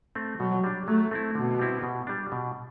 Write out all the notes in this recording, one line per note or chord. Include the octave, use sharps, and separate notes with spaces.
A3 C4
B2 F#3
G3 D4
F#3 A3
A3 C4 E4
B2 D3
G3 C4 E4
B2
G3 D4
B2